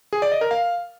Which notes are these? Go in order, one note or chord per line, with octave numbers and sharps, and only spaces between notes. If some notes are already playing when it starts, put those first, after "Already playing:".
G#4
D5
D#5
A#4
F5